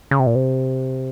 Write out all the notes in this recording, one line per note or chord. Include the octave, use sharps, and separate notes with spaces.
C#3
C3
A#2
C3